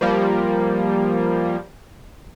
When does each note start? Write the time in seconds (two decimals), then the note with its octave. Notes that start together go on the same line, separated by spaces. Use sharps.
0.01 F3 G3 A#3